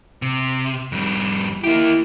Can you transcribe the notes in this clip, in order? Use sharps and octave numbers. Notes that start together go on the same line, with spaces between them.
C3
F2 G3
A#3 E4 G4